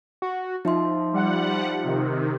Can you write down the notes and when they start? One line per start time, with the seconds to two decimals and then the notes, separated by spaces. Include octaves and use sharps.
0.22 F#4
0.65 F3 D#4 E5 C6
1.13 G3 F#5
1.83 C3 D#3